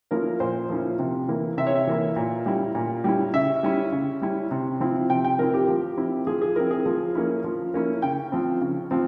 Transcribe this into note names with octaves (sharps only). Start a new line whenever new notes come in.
F3 A#3 C#4 E4 A#4
A#2 C5
F3 A#3 C#4 E4
C3
E3 A#3 E4
C3 E5
C#5
E5
E3 A#3 E4
A#2
G3 C#4 E4
A#2
G3 C#4 E4
C#3 E5
G3 C#4 E4
C#3
G3 C#4 E4
C3
F3 C4 E4
C3 G5
G5
F3 C4 E4 A#4
G4
F3
C4 E4
F3 G#4
G#4
C4 E4 A#4
G#4
F3
A#3 C#4 E4
F3
A#3 C#4 E4
C#3 G5
F3 C4
C#3
F3 C4